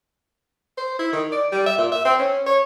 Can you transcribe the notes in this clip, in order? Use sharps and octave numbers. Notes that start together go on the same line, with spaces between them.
C5
E4
D#3
D5
G3
E5
A#2
E5
C4
C#4
C#5